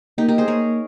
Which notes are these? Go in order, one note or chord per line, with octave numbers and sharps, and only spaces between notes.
A#3 D#4 G4
G4 A#4
G#4 C5
A#3 A#4 C#5